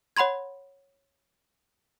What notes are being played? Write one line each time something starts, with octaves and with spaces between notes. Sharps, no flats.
C#5 F#5 B5 C6 G#6